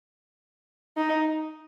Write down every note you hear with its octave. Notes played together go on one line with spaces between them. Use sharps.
D#4